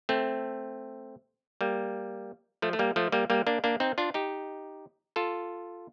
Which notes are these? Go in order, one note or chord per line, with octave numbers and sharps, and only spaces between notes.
A3 C4
G3 A#3
F3 A3
A3
G3 A#3
F3 A3
G3 A#3
G3 A#3
A#3 D4
A#3 D4
C4 D#4
D4 F4
D#4 G4
F4 A4